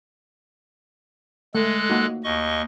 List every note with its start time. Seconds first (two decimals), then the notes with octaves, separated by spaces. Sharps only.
1.55 G#3 A3 A4 F#6
1.90 A#3 D#4 F#4
2.24 D#2 D#5 C#6